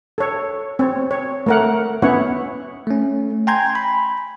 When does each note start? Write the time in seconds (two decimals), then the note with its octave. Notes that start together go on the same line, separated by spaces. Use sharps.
0.18 A4 C#5
0.79 C4 C#5
1.11 C#5
1.46 A3 A#4 F#5
2.02 B3 C#4 E4 C#5 F#5
2.87 A3 C#4
3.47 G5 G#5 A#5 C6 G6 G#6
3.75 B5